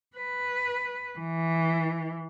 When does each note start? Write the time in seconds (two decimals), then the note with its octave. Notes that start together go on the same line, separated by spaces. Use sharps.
0.16 B4
1.19 E3